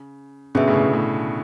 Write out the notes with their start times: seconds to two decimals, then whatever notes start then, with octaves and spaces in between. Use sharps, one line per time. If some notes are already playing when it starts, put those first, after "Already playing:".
Already playing: C#3
0.55 B2 D3 C#4 G#4 B4 E5
0.68 A2 C#3
0.75 B2
0.81 A2
0.94 A2